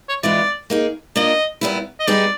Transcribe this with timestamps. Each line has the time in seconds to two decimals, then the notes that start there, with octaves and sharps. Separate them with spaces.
0.09 C#5
0.23 E3 G#3 B3 D4 F4 D5
0.70 A#3 D#4 G#4
1.16 A#3 D4 F4 D#5
1.61 A#2 G3 B3 E4
2.00 D#5
2.07 G3 B3 D#4 G#4 D5